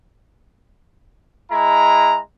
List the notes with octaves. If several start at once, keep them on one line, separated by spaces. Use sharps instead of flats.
G#3 E4 A#5